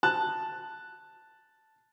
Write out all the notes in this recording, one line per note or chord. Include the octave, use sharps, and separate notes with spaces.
A5 F#6